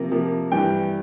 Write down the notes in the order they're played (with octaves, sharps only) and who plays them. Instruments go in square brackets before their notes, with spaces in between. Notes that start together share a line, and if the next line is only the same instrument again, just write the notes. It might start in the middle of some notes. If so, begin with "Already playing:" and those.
Already playing: [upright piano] C3 F3 A#3
C3 F3 A#3
G2 E3 G3 G5